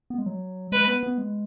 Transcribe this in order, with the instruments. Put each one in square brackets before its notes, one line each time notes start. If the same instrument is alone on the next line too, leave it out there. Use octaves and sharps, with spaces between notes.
[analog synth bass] B3
G#3
F#3
[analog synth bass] G#3 [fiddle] B4
[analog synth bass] B3
B3
G#3